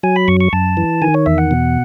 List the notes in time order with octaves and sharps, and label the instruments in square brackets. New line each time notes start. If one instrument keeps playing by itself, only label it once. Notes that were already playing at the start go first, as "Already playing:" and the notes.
[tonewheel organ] F#3 G#5
B5
F#2 C#6
C#6
F#2 A5
E3
D#3 G#5
C#5
E2 E5
F#5
B2